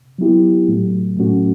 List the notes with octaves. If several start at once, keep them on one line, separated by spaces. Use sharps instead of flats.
F#3 B3 E4 G4
A2 F#3 A3
A2 F#3 A3 C#4 F#4